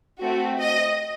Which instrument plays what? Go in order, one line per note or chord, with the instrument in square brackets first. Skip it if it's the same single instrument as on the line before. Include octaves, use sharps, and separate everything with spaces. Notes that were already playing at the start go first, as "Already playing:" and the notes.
[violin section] A3 C4 F#4
D#5